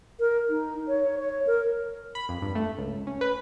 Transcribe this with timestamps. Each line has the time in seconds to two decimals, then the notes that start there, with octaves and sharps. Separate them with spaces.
0.20 A#4
0.50 D#4
0.88 C#5
1.19 C#5
1.47 A#4
2.15 B5
2.29 F2
2.42 G2
2.55 A3
2.78 C#2
3.07 C#4
3.21 B4